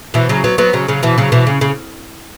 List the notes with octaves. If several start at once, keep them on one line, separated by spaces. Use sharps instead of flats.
B2 E3
C#3 F#3
F#3 B3
F#3 B3
C#3 F#3
C#3 F#3
B2 E3
C#3 F#3
B2 E3
C#3
C#3